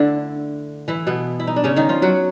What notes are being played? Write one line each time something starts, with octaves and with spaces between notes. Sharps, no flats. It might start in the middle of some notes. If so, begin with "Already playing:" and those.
Already playing: D3 A3 D4 E4
E3 E4
B2 B3
E4
D#4
D4
C#3 C#4
D#3 D#4
F3 F4
F#3 F#4